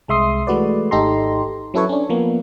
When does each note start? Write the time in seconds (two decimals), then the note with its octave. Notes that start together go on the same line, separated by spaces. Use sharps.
0.08 C2 G#3 E5 C6 D#6 C7
0.47 E3 G#3 A3 F#4 B4 D5
0.91 G#1 D#4 G4 A4 A#5 C6
1.74 F#3 C#4 E4 A4 B4 C#5
1.89 C#4 D4
2.09 F3 A#3 B3